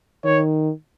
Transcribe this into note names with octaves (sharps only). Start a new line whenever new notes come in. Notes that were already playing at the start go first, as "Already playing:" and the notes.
D#3 C#5